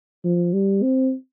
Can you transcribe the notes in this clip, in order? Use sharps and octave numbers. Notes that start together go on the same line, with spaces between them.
F3
G3
C4